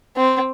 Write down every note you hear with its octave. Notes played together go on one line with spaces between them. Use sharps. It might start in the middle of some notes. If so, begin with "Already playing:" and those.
C4